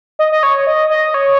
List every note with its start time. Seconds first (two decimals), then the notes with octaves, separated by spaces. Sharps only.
0.19 D#5
0.32 D#5
0.43 C#5
0.67 D#5
0.90 D#5
1.14 C#5